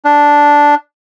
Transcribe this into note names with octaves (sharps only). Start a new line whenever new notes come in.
D4